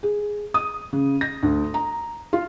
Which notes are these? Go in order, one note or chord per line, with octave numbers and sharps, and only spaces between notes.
G#4
D#6
C#3
A#6
D2
A#5
F4